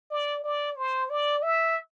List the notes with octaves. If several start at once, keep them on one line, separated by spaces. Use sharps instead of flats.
D5
D5
C5
D5
E5